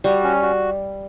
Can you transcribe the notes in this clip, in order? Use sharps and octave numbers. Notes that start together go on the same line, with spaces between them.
G3 F#4
C#4
F#4